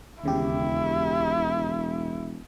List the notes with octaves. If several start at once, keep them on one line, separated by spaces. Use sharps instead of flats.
E1 D#2 C#3 E4 G4